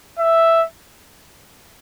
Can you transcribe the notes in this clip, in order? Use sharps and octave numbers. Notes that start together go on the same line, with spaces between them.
E5